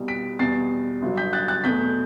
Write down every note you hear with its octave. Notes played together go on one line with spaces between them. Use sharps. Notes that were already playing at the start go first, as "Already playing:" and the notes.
Already playing: C2 B2 G3
B6 D7
E2 B2 G3 A6 C7
G1 G2 F#3
G6 B6
F#6 A6
F#6 A6
E2 B2 A3 G6 B6